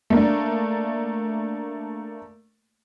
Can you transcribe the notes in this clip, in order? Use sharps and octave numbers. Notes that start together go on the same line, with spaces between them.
A3 A#3 D4